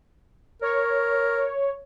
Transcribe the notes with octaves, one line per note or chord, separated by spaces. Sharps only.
A#4 C#5